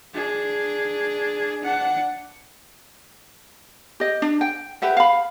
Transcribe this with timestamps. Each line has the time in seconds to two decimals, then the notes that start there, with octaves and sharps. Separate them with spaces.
0.14 D4 G#4
1.62 D4 F#5
4.00 G4 D#5
4.22 D4
4.41 G5
4.82 G4 B4 E5 F#5
4.97 F5 B5